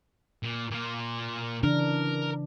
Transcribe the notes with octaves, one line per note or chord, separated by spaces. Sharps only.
A#2
A#2 F4
C#3 E3 D4 A#4